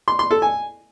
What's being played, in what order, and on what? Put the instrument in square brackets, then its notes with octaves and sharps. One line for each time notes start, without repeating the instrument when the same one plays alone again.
[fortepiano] C6
C6
A4
G#5